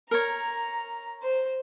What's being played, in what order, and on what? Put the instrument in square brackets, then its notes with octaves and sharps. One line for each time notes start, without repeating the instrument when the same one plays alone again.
[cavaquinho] A#4 C#5 [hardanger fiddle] A#5
[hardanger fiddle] C5